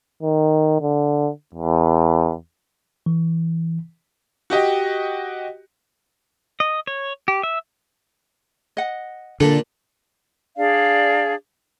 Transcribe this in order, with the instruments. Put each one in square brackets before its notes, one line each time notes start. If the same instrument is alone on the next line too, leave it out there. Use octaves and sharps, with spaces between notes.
[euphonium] D#3
D3
E2
[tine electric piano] E3
[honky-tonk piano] F#4 G4 D#5 G5
[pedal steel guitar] D#5
C#5
G4
E5
[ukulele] D#5 F#5
[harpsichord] A#2 D4 [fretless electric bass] D3 [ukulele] A4
[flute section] D4 G#4 D5 F5